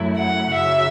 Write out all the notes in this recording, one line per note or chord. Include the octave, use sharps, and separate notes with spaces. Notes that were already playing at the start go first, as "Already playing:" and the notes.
Already playing: F#2 F#3 A3 E4
F#5
F#2 C#3 F#3 E5